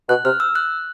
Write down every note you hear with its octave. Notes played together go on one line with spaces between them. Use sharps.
B2 F#6
C3 F6
E6
F#6